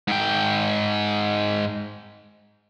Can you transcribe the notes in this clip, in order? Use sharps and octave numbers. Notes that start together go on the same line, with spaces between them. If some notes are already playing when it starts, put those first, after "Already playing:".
G#2 G5